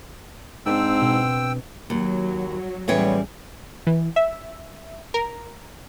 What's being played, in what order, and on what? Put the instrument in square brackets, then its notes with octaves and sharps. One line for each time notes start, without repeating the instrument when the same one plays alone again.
[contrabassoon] G#2 [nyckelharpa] C4 [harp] D4 [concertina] G5 E6
[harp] B2
[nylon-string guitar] D#2 [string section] F#3
[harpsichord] C#2 A2 E3 [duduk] G3 [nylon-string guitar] B3 C4 C#5
[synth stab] E3
E5
A#4